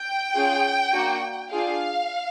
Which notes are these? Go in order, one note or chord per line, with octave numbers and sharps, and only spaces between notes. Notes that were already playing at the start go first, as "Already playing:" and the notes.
Already playing: G5
C#4 F4 G#4
A#3 D4 F#4
D4 F4 G#4 F5